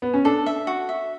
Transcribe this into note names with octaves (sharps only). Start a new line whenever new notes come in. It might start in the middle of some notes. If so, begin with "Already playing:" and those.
B3
C#4
D4 A4
E5
F#4
E5